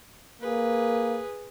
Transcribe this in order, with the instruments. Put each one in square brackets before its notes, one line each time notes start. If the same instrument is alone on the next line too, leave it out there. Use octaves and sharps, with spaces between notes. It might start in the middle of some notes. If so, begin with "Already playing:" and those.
[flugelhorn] A#3 [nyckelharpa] G#4 B4